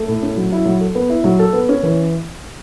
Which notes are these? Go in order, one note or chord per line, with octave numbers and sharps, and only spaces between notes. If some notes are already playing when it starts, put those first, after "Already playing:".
Already playing: A3
A2
C#4
F#3
E4
F#3
A4
B3
E4
F#3
A4
B3
C#4
E3